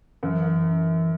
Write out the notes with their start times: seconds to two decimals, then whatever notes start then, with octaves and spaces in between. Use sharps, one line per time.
0.23 F#2 E3